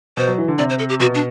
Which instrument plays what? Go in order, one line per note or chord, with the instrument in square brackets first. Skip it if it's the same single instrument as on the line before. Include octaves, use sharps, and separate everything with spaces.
[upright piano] B2 [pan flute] C5
[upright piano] F#3
E3
D3
[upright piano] C3 [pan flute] D5
[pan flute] C5
A4
G4
[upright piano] B2 [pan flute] F#4
[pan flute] D4